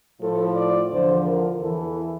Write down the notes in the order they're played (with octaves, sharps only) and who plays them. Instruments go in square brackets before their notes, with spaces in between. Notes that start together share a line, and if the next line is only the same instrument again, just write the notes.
[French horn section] A2 F3 A4
D5
E2 D3 F3 C5
A#4
E2 E3 A4